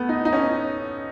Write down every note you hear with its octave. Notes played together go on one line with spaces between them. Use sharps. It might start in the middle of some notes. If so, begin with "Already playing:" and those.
Already playing: A3 B3
D#4
D#4
C#4